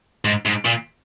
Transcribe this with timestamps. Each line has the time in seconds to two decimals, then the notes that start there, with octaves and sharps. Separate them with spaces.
0.25 G#2
0.45 G#2
0.65 A#2